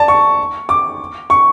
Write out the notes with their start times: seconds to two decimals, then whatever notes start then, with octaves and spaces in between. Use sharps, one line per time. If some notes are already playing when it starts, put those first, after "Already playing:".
Already playing: D5 A5
0.08 C#6
0.69 D6
1.30 C#6